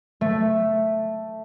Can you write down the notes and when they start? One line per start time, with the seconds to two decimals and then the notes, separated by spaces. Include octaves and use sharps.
0.21 A3